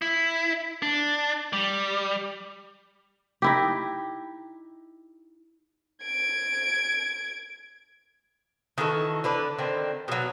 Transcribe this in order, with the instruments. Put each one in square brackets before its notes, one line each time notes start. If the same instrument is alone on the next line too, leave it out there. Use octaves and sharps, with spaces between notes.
[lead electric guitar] E4
D4
G3
[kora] D#4 E4 G4
[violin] G#6 D7
[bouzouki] D#3 E3 F#4 A4
D3 B4 D5
D3 D#3 C4
B2 F#3